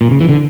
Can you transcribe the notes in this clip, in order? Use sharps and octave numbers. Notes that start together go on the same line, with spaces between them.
A#2
C#3
E3
D3